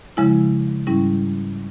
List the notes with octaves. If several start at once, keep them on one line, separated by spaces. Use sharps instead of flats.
C#3 F3 G#3 E4
G#2 G3 C#4 E4